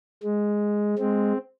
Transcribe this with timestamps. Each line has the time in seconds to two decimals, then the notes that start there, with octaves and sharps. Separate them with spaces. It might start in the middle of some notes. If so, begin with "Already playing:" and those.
0.24 G#3
0.99 G#3 C4